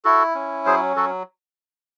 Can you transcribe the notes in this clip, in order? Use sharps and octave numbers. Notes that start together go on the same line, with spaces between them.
E4 F#4 A4
C#4
F#3 G#4 C5
F#3 F#4 A4